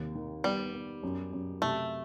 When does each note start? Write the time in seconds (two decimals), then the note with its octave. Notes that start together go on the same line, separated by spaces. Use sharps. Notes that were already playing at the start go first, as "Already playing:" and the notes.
Already playing: D#2 C3
0.15 D#3
0.44 G3 B3
0.73 B3
1.03 F#2
1.33 F#2
1.62 C3 A3